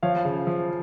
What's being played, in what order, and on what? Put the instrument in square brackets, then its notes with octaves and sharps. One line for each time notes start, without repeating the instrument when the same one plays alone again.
[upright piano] F3 C#5 F5
C#3
F3